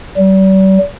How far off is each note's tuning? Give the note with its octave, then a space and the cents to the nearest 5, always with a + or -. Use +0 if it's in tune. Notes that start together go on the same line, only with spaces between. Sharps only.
G3 -40